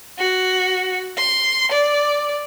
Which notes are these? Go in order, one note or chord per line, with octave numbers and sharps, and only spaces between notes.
F#4
C6
D5